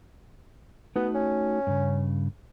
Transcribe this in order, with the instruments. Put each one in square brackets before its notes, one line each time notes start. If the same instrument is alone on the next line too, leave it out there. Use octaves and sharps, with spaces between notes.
[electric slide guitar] A3 D#4 F#4 [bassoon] B3
[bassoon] C#4
[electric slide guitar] G2 C#3